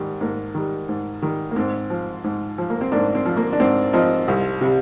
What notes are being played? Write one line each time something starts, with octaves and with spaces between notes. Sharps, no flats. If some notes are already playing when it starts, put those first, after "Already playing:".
Already playing: G#2 D#3 G3
G#2 A#3
D#3 G3
G#2
D#3 G3
A#3
G#2 C4
F3
G#2
F3
A#3
C4
G#2 A#3 D4
C4
F3
A#3
D4
G#2 C4
F3 C4 D#4
C2
C3 G3